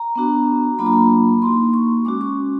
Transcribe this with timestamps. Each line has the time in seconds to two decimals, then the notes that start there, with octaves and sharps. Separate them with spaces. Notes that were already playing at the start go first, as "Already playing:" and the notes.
Already playing: A#5
0.15 B3 D4 F#4
0.79 F#3 A#3 D4 F4 B5
0.86 A#5
0.93 B5
1.42 A#3 D#4 F#4 C6
1.74 C#6
2.05 G#3 C#4 F#4 D6
2.21 C#6